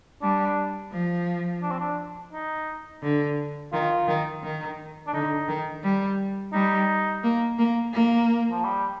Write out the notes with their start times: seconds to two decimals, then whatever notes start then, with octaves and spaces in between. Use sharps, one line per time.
0.22 G3 D4
0.92 F3
1.62 D4
1.71 C4
1.80 D4
2.32 D#4
3.03 D3
3.73 D#3 F4
4.08 D#3
4.44 D#3
5.07 D4
5.13 D3 D#4
5.48 D#3
5.84 G3
6.53 G3 D#4
7.24 A#3
7.58 A#3
7.94 A#3
8.51 F3
8.64 G3